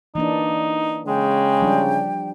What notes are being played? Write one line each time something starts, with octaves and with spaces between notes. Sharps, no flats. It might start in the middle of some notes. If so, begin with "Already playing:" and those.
E3 A#3 D4 D#4
C#3 G#3 G5
F3 G3 D4